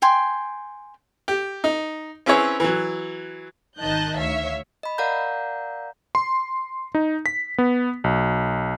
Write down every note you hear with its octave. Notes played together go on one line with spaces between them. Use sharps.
G5 G#5 C6
G4
D#4
C4 C#4 E4 G#4 B4 C#5
E3 F#3
G#1 D#3 D#5 A5 F#6 G6
D2 C#5 E5 F5 B6
D#5 B5
A#4 D5 F5 F#5 A#5 G6
C6
D#4
B6
B3
B1